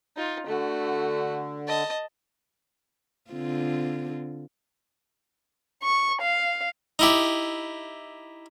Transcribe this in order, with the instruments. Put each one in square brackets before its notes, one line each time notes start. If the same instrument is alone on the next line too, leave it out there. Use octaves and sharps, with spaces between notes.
[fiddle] D#4 F4
[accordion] D3 [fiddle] A3 F#4
[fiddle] D#5 A5
[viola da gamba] D3 C4 F4
[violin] C#6
F5
[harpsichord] D#4 E4 G4